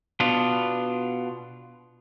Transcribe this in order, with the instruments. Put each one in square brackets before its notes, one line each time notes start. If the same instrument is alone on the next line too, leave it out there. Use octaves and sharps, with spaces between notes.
[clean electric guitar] B2 B3 D4 F4